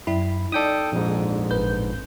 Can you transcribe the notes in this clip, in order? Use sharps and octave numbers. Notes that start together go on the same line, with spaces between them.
F#2 E4 B5
D#4 A4 D5 G5 D#6
A#1 F2 G#2
A1 B4 G6